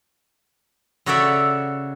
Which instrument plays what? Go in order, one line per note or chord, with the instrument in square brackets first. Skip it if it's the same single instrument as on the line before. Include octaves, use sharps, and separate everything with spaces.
[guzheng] C#3 F#4 A4 C#5 D5 E5